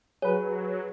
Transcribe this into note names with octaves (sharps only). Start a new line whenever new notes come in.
F#3 G#4 B4 C#5